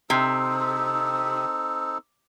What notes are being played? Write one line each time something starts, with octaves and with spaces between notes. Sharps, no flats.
C3 C4 D#4 A4